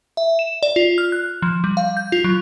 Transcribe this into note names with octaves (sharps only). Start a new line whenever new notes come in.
E5
E7
D5
F4
F6
F#6
F3
G3
F5
G6
F4
F#3